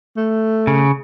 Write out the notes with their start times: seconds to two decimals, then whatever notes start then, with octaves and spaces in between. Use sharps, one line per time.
0.16 A3
0.67 C#3